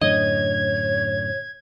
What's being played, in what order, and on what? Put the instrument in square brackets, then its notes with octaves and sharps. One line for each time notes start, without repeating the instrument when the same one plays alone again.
[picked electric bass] F#2 A2 D3 [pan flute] C#5 [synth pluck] D#5 [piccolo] G#6